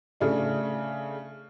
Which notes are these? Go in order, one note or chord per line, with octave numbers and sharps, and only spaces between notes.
C#3 A3 D4